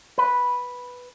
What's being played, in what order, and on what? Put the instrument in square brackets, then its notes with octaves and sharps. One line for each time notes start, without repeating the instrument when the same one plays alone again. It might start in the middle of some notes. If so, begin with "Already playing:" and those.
[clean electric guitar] B4